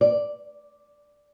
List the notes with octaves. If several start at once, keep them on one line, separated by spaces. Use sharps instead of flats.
D5